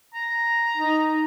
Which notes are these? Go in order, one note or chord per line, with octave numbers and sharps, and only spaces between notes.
A#5
D#4